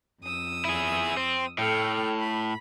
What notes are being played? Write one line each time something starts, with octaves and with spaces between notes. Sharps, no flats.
F2 D#6 E6
E4 G#4
C4
A2 A4 G5 F6
B5